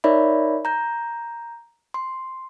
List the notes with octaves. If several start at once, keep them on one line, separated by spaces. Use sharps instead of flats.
D#4 A#4 C#5 D5 E5 B5
A#5 G6
C6